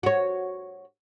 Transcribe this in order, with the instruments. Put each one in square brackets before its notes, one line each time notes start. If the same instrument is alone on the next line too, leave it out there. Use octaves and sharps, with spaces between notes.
[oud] F#4 C#5